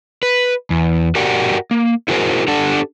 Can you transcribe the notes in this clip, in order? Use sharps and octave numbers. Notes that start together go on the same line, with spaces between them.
B4
E2
F#4 G4 A#4 D5 F#5 G5
A#3
E4 F#4 G#4 A#4 C5
D4 G4 A4 F#5